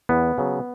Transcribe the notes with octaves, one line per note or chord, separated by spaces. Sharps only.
E2 B3
C#3 F#3